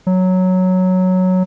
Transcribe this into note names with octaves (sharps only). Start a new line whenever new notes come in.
F#3